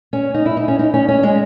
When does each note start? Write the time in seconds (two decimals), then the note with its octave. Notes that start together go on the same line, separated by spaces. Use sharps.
0.13 C#4
0.34 D#4
0.46 E4
0.57 D#4
0.68 C#4
0.79 D#4
0.94 C#4
1.08 C#4
1.23 G#3